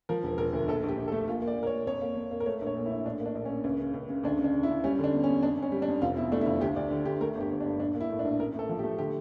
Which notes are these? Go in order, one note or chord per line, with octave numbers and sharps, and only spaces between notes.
F3 A#4
E1
E1 A#4
D2
A#1 A4
A#1
G4
A#1
A4
A3
A#2 F4
A#3
D5
A#2
A#4
C#5
A#2
F2 C#5
A#3
F2
A#3
A#4
A3 C#5
A#1 C#5
A#2
E4
A#1
A2 D4
A#3
D4
A#1
A#3 C#4
C#2
C#3
C#2
C#3
D2 D4
C#3
D4
C#3
E4
C#3
G3 C#4
D3 D4
E2
C#4
E2
F2 D4
F2
C#4
G3
D4
F2
F1 F4
E2 E4
A3 D4
E4
F1 F4
D2 G4
D2 D5
D3 G4
D2 G4
A3 A#4
G1
G4
G1
D4
G2
A#1 D4
A#3
E4
A2
D4
A#1
A1 A#4
A2 A4
F3
G4
A3
D3 G4